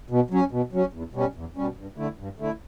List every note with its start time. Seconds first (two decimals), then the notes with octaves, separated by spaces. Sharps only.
0.10 B2
0.30 F#3 C#4
0.52 B2
0.72 F#3 C#4
0.93 E2
1.14 B2 G3 C#4
1.35 E2
1.56 B2 G3 C#4
1.77 G2
1.97 D3 A3 E4
2.18 G2
2.39 D3 A3 E4